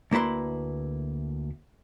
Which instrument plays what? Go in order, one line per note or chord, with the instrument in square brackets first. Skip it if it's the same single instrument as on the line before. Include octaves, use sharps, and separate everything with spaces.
[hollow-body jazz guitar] D2 A#3 E4 B4 C6